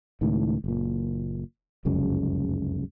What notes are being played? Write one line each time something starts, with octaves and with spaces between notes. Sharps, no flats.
C#2 A2 D#3
F#1 A#2
F1 C#2 F#2 C#3